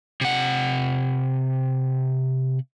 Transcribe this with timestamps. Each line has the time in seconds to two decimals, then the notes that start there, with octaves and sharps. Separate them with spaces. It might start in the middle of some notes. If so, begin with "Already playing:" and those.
0.21 C3 F#5